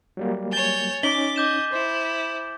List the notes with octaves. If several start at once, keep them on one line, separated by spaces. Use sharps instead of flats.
F#3 G3 A#3
C#5 G#5 G6 A6
C#4 D#4 D6 B6 F#7 G7
D#5 D6 G6 E7
E4 C5